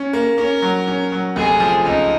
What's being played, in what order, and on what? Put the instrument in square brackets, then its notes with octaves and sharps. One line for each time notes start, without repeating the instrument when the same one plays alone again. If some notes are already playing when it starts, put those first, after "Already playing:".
Already playing: [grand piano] C#4
A#3
[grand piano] C#4 [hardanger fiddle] A#4
[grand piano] F#3
C#4
F#3
[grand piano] F1 [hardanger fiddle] G#4
[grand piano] F3
[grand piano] C#2 [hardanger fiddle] D#4